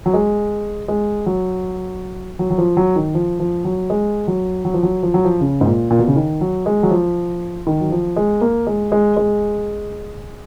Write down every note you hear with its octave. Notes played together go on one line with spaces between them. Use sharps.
F#3
G#3
G#3
F#3
F#3
F#3
F3
F#3
D#3
F3
F3
F#3
G#3
F#3
F#3
F3
F#3
F3
F#3
F3
C#3
G#2
A#2
A#2
B2
C#3
D#3
F#3
G#3
F#3
F3
D#3
F#3
F3
G#3
A#3
G#3
G#3
G#3